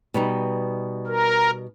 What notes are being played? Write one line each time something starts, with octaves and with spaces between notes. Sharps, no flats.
B2 G3 D#4
A#4